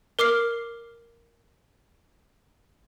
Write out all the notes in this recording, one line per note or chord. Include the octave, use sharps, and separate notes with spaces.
A#4 D6 F6 C7